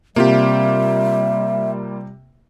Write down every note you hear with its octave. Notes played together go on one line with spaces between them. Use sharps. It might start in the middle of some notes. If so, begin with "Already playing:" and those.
C3 G3 A#3 F4 G4 E5